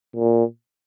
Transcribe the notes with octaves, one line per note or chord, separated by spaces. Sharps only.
A#2